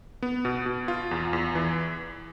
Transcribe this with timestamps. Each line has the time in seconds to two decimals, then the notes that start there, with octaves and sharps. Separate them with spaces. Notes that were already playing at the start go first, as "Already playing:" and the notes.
0.22 B3
0.45 B2
0.66 B2
0.88 F4
1.11 E2
1.33 E2
1.55 E3